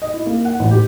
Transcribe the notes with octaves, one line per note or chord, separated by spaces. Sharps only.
D#5
E4
A#3
F#5
A1
G4